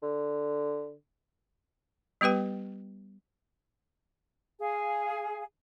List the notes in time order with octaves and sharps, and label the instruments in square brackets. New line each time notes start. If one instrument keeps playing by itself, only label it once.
[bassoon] D3
[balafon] G3 B3 G4 B4 G5
[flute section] G#4 F5